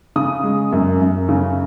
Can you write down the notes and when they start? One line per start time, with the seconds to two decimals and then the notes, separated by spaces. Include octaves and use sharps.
0.16 C#3 D#6
0.43 G#3
0.72 F#2
1.01 F#2
1.29 C#3